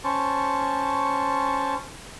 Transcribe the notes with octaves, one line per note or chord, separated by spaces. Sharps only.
C#4 C5 A5 C#6